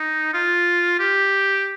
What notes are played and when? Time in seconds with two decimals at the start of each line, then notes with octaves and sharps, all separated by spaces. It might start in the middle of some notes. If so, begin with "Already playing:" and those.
Already playing: D#4
0.34 F4
0.99 G4